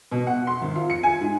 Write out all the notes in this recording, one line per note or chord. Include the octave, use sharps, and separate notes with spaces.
B2
F#5
C6
G#1
F4
C#7
G#5
G#2